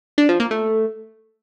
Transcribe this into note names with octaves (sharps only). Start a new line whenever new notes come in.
D4
F3
A#3
A3